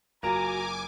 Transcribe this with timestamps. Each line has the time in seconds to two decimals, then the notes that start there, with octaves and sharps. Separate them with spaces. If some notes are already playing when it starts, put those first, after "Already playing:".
0.23 F#1 F4 F#4 A#4 G#5 A#5 D6